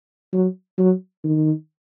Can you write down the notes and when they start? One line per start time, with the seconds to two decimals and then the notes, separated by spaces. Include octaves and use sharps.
0.32 F#3
0.78 F#3
1.24 D#3